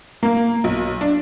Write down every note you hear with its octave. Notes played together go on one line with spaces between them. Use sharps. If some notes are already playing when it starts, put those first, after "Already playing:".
A#3
B1
D4